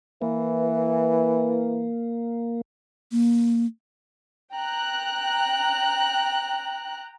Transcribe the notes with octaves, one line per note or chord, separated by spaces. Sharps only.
E3 A#3
A#3
G5 A#5 F#6